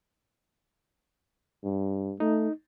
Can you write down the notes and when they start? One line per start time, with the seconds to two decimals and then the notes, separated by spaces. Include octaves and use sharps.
1.64 G2
2.20 A3 D#4